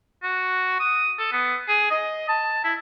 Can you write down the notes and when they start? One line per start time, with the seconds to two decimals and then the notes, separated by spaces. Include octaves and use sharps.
0.23 F#4
0.80 D#6
1.19 A4
1.32 B3
1.68 G#4
1.91 D#5
2.28 A5
2.64 E4